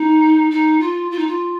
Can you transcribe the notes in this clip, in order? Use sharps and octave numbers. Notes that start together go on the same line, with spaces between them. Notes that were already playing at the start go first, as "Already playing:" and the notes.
Already playing: D#4
D#4
F4
F4
D#4
F4